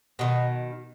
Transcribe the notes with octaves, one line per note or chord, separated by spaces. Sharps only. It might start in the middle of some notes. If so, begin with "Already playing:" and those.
B2 D#3